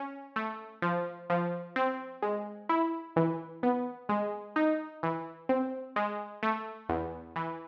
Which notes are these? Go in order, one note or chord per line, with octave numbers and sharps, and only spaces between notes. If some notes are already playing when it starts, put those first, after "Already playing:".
Already playing: C#4
A3
F3
F3
C4
G#3
E4
E3
B3
G#3
D#4
E3
C4
G#3
A3
E2
E3